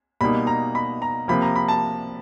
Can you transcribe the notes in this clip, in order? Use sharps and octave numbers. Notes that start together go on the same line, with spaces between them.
B2 G3 A#3 D#4 B5
A#5
B5
A#5
C3 F3 A#3 B5
A#5
B5
A5